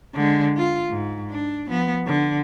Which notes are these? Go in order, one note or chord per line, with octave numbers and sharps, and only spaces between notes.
D3 G#3
F4
G#2
D4
F3 B3
D3